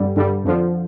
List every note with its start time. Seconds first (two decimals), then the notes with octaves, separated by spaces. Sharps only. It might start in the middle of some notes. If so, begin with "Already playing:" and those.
Already playing: G2 D3 G3
0.16 G2 D3 G3
0.44 F2 D3 F3